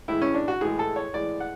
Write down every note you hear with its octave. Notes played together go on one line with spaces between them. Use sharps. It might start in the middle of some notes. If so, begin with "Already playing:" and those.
A2 E3 G#3 E4
C#4
D4
F#4
A2 E3 G#3 G#4
A4
C#5
A2 E3 G#3 D5
F#5